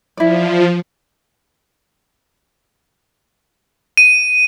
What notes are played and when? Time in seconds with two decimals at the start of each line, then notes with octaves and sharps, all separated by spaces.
0.17 F3 E4 D5
3.97 D#7